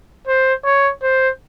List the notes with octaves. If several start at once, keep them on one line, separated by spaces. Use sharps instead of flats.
C5
C#5
C5